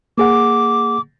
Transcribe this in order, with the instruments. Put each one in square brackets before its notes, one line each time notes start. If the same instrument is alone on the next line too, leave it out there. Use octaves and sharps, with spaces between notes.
[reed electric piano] A#3 G#4 F#5 [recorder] D6